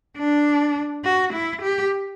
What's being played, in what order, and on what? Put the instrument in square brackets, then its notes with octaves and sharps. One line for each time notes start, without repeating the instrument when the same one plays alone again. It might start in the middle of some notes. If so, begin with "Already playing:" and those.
[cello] D4
F#4
E4
G4